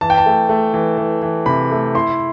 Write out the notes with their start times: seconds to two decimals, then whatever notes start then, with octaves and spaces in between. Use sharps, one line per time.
0.01 E3 A5
0.10 G5
0.18 A5
0.26 A3
0.49 A3
0.74 E3
0.98 E3
1.22 E3
1.46 C3 B5
1.71 A3
1.95 E4 C6